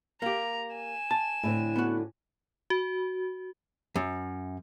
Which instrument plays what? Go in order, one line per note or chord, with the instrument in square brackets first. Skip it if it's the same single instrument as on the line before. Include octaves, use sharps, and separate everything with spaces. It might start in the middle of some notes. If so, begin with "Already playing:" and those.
[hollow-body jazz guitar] A#3 G4 [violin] A#5
[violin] G#5 E7
[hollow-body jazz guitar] A5
[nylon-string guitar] A2 D3 C4
[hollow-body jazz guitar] B3 F#4
[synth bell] F#4
[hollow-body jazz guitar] F#2